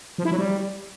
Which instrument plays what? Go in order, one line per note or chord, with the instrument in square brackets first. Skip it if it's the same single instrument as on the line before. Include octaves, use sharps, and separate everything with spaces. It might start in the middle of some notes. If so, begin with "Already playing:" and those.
[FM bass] F3
E4
F#3
G3